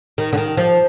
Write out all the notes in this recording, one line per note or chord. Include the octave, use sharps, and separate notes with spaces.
D#3
D3
D#3
F3